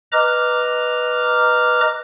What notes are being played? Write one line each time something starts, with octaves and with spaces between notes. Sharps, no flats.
B4 D#5 A#5 D6 F6